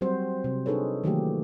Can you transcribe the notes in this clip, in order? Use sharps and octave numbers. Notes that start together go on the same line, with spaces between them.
F#3 G3 C4 F#4 C5
C3
D4 D#4 G#4 A4 B4 C#5
D#3 E3 F#3 A3 A#3 G4